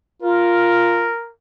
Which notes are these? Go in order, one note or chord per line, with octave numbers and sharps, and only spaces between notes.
F4 A#4